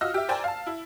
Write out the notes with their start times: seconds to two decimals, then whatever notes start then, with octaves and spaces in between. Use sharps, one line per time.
0.01 F4 F#4 D#5 E6 F6
0.14 G4 E5
0.28 A#4 C5 D5 G5 G#5 A6
0.44 F5 A5
0.67 E4